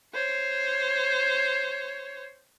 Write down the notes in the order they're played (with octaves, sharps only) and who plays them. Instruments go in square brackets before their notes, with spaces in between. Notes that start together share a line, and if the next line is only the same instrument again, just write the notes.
[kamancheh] C5 C#5